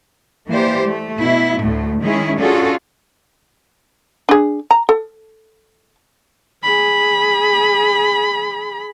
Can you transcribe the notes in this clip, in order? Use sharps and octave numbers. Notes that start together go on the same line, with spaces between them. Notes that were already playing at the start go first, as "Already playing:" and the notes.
E3 A#3 G4 C5 D5
A3
B2 E4
D2 A2 A3
D#3 G#3 C#4 E4 G#4
C#4 D4 F4 F#4 G#4 A4
D4 G#4
A#5
A4
G#4 B5